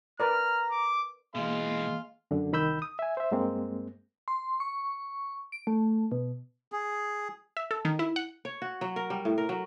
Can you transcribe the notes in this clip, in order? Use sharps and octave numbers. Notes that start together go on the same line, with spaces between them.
A#4 B4 D5 A#5 F6
D6
B2 E3 G#3 A#3 F5 C6
F#2 D3
C2 D#3 B5 E6 G6
D#6
E5 G#5
C5 E5
G2 G#3 A#3 C4
C6
C#6
D7
A3
B2
G#4
E5
A4
D#3
E4
F#5
C#5
F#4
F#3
A#4
G3
A2
A#4
F#3